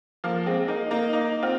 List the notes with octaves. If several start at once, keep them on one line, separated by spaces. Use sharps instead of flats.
F3 A#3
G#3 C4
A#3 D#4
A#3 D#4
A#3 D#4
C4 F4